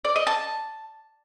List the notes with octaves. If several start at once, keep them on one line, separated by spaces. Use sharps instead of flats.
D5
D#5
A5